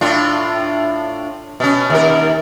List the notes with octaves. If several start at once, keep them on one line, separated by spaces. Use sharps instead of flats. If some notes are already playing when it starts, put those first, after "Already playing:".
A2 D4 F4
B2 C#4
D#2 A#4